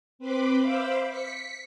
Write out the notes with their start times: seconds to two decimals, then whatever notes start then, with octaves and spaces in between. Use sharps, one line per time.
0.19 C4 B4 B5 C6 D6
0.59 C5 E5 F5 B5 D6
1.08 B6 C#7